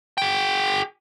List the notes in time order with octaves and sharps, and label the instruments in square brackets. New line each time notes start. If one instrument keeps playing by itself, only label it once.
[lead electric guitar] G#4 G5